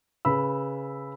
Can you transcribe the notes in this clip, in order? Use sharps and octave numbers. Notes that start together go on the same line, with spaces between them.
C#3 B4 B5 E6